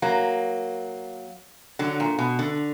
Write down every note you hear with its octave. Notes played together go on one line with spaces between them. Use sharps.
F#3 A#3
D3 F#3
A#2
B2
D3